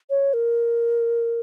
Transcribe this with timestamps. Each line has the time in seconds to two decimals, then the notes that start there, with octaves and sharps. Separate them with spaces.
0.10 C#5
0.34 A#4